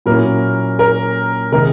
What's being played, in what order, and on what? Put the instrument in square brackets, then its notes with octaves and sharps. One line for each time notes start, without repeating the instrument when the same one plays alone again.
[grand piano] A#2 F#3 A#3 C#4 E4 [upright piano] A#4
[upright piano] A#4
[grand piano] C3 D#3 G#3 [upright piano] A#4